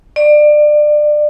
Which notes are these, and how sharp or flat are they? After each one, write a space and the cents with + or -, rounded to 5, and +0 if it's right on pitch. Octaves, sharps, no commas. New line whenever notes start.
D5 +25